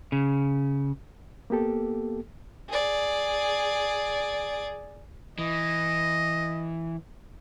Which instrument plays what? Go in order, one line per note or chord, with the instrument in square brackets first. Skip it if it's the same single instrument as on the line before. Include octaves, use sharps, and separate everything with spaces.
[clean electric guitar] C#3
[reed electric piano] A#3 B3 G4 A4
[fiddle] G#4 D5
[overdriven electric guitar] E3 [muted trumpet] D#5